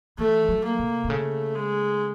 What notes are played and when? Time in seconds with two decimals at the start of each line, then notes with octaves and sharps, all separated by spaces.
0.18 E3 A3
0.49 F#3
0.64 A#3
0.79 C3
1.05 C3
1.09 C#3 A3
1.55 G#3